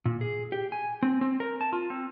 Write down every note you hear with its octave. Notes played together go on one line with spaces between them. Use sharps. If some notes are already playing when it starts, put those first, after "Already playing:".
A#2
G#4
G4
G#5
C4
C4
A#4
A5
F4
C4